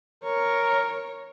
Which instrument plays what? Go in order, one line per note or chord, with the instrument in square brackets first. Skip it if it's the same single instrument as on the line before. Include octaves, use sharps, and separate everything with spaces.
[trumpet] A#4 [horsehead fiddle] C#5